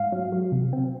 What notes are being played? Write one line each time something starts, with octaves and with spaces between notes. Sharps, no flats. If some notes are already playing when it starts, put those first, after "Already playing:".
Already playing: G#2 F5
F#3
F#3
C3
C4